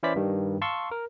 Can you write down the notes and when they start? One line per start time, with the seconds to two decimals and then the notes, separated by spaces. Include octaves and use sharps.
0.03 E3 C#4 E4 C5 D5 B6
0.16 G2 D#3 G3
0.61 F5 A5 C6 C#6 E6
0.91 A#4